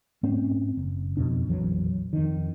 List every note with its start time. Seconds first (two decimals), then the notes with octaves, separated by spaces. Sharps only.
0.23 G#2 A3 C4 C#4
0.77 F#1
1.17 F2 B2 D4
1.48 A#1 F2 E3 F#3
2.13 F2 D#3